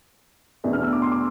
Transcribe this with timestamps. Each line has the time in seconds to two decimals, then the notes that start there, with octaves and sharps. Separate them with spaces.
0.64 E2 B2 A3 D4
0.73 F6
0.83 E6
0.93 D6
1.02 C6
1.12 D6